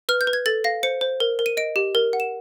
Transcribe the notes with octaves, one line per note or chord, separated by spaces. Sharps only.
B4 F6
G6
B4
G#6
A4 A6
F5 A#6
C5 C#7
C5
A#4
A#4
D#7
D#5 D7
G4
A#4
F#5
E7